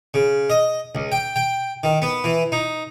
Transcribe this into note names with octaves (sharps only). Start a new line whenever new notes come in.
C#3
D#5
C#2
G5
G5
D#3
B3
E3
D#4